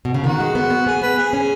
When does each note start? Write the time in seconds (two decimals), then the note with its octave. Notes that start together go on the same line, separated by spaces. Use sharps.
0.05 B2
0.14 C#3
0.24 D#3 F#4
0.40 G#3
0.55 B3
0.70 B3
0.87 B3 G#4
1.02 B3 B4
1.18 B3 G#4
1.33 C#4